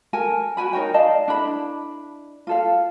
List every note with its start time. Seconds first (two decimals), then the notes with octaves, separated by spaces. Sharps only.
0.13 A4 A#4 G5 G#5
0.57 F#4 G5 G#5 B5
0.73 D#4 A#4 C#5 G5
0.94 D5 D#5 F5 A5
1.28 D4 E4 A4 B5
2.47 F4 A4 F5